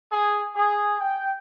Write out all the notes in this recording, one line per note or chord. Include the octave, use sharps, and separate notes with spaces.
G#4
G#4
G5